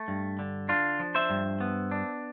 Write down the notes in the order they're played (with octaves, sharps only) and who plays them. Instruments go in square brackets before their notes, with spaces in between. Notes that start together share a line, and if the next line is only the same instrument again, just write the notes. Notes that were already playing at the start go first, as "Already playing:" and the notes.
Already playing: [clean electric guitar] A3
G2
D3
D4 F4
F3
C5 E5
G2
B3
D4